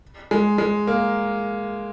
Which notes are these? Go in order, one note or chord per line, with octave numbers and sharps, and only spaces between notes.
G#3
G#3
A#3